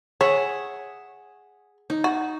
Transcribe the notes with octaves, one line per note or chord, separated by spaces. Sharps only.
G#4 C#5 E5 F#5
D#4
F#4